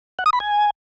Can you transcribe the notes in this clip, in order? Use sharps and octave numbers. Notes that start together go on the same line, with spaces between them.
F#5
D#6
B5
G#5